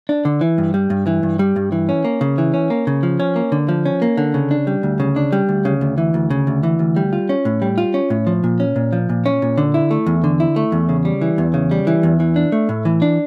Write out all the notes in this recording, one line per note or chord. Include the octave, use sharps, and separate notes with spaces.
D4
D3
E3
G2
G3
G2
E3
G2
G3
G2
E3
C#4
A#3
C#3
E3
C#4
A#3
C#3
F3
C#4
A#3
D3
F3
C#4
A#3
D3
C#3
D4
G3
D2
C#3
D4
G3
D2
C#3
D2
E3
D2
C#3
D2
E3
D2
G3
F4
C#4
A2
G3
F4
C#4
A2
F3
A#2
C#4
A#2
F3
A#2
C#4
A#2
D3
E4
A3
E2
D3
E4
A3
E2
C#3
G3
E3
E2
C#3
G3
E3
E2
E3
D4
A3
A2
E3
D4